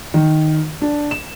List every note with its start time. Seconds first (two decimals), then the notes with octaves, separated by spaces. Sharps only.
0.14 D#3
0.82 D4
1.11 E7